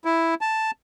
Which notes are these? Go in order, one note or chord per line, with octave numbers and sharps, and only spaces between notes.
E4
A5